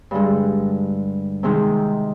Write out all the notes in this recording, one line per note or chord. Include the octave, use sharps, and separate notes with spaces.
G2 D3 G#3
C3 D#3 G#3 C4 D#4